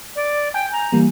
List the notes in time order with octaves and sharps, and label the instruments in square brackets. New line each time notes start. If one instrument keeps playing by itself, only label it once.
[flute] D5
[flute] G5 [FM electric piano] G#5 G6
[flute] A#5
[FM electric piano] E3 G3 [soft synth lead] A#3